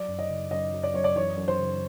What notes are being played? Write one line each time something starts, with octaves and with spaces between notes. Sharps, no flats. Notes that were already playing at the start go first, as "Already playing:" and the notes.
Already playing: F#3 D5
F#2
D#5
C#3
F#2 D#5
F#3
D5
F#2 C#5
D5
E3 C#5
F#2
C5
C#3